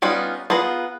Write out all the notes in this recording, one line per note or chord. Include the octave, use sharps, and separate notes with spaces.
G3 B3 C#4 D#4 F4
B3 F4 G#4 A#5